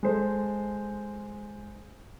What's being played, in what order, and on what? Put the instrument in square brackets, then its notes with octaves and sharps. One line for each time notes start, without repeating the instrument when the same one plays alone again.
[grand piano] G#3 A4 C5